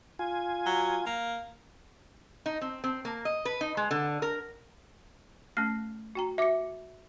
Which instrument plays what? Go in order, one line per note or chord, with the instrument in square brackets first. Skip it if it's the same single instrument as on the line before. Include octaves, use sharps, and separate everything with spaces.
[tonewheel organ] F4 G#5
[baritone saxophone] F#3
A#3
[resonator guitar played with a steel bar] D#4
C4
C4
A#3
D#5
B4
D#4
G#3
D3
A#4
[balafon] A3 C#4 [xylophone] F6 C7
[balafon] F#4 G5 A#5
[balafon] F#4 D6 [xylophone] E5 C#7